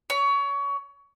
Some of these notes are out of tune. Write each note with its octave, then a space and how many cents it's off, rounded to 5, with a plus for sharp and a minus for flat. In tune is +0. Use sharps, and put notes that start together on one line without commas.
C#5 +25